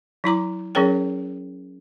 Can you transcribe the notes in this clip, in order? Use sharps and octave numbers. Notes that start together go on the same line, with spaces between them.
F#3 E4 A#5 D6
F#3 C#4 G#4 A#4 C#5 G5